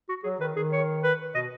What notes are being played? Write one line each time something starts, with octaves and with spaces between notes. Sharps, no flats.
F#4
F#3 G#4
D#3 B4
D#3 G#4
C#5
B4
B2 D#5